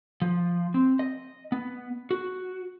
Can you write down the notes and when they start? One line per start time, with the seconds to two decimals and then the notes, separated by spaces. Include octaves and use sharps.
0.22 F3
0.74 C4
0.99 D#5
1.52 B3
2.11 F#4